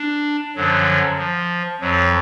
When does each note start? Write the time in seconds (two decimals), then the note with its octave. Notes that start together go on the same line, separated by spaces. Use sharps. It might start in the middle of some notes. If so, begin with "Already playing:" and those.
Already playing: D4
0.56 F#2 D3 F3 F#3
1.18 F3
1.81 F2 F3 F#3